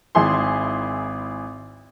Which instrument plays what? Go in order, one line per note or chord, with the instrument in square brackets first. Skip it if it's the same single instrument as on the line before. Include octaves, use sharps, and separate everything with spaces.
[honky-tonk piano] G#1 E4 G#4 C6